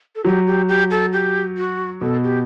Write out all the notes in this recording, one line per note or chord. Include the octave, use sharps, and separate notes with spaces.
A4
F#3 G4
G4
G4
A4
G4
F#4
B2 A4
G4